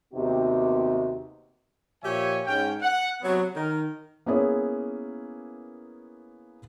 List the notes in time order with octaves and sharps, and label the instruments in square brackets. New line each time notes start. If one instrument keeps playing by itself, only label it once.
[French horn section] D#2 C3 B3 D#4 F#4 G4
[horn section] A#2 F3 G4 C#5 E5 G#5
G#2 C#4 G5
F#5
C3 F#3 B3
D#3 A#4
[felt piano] A#3 B3 C#4 E4 G#4 C#5